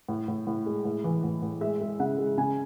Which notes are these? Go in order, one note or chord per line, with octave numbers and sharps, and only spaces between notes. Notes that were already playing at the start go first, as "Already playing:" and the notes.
A2
A2
A2
G#3
A2
E3
A2
A2
G#3 E5
G#3
C#3 F#5
G#3
C#3 G#5